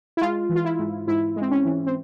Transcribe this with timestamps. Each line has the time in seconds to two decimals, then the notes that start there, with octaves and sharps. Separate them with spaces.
0.17 E4
0.21 G#3 F4
0.50 E3
0.55 F4
0.65 E4
0.79 G#2
1.07 G#2 E4
1.36 G#3
1.42 C4
1.51 C#4
1.65 E3
1.87 C4